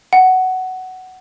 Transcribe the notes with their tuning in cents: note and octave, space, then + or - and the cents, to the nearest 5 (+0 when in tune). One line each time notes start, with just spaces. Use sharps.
F#5 +10